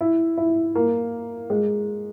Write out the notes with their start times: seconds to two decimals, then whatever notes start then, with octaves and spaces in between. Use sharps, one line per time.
0.01 E4
0.37 E4
0.75 A#3
1.50 G#3